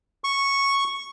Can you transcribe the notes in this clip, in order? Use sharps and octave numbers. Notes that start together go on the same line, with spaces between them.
C#6